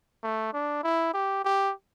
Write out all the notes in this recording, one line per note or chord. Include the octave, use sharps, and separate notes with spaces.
A3
D4
E4
G4
G4